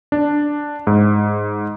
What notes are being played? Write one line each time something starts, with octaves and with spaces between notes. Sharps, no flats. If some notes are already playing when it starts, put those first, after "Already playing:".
D4
G#2